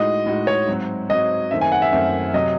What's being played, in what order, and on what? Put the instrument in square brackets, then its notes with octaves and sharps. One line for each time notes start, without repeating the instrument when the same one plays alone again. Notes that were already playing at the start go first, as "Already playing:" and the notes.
Already playing: [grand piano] A2 G#3 D#4 F#4 [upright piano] D#5
[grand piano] A2 G#3 D#4 F#4
[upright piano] C#5
[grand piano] G#2 F#3 C4 F#4
[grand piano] G#2 F#3 C4 F#4 [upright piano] D#5
[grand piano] F#2 D#3 A3 C4 [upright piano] E5
[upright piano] G#5
F#5
E5
[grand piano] F#2 D#3 A3 C4
[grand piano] C3 F#3 [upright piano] D#5